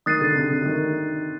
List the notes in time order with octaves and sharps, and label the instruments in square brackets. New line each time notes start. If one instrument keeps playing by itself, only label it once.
[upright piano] D#3 [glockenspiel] D#6 F#6 A6 C7 D#7
[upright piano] D3
C3
D3
D#3